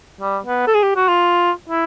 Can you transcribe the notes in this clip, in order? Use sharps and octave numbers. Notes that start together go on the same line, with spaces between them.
G3
B3
A4
G#4
G4
F#4
F4
E4